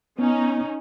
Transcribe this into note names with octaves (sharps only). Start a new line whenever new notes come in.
B3 C#4 D#4